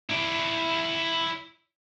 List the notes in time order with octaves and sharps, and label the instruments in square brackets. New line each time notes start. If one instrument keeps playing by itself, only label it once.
[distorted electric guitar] E4 D5